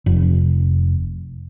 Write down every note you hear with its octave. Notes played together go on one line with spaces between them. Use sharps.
F1